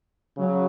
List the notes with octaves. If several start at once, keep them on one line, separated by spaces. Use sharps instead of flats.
C#3 F#3